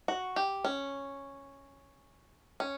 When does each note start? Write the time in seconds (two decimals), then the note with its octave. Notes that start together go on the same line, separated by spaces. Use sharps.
0.08 F#4
0.36 G4
0.65 C#4
2.60 C#4